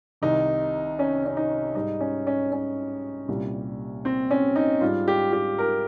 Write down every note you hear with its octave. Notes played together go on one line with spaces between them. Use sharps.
C2 C3 D#3 D#4
C#4
C#4
D#4
G#2 G3 D#4
C#4
C#4
C#4
C2 A#2 G3
C4
C#4
D#4
G#2 G3 F4
G4
G4
A#4